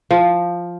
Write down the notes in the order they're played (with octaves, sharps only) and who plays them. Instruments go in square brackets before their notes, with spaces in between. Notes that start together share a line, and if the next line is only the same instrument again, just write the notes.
[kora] F3